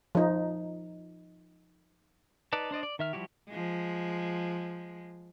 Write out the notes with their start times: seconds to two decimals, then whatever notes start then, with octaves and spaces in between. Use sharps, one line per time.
0.15 F3 D#4
2.53 D#4 B4 D5 A5
2.71 D4 C5 D5 D#5
2.83 D5
2.99 D#3 E5 F6
3.13 F3 G3 E4 F#4 G4
3.50 F3 G#3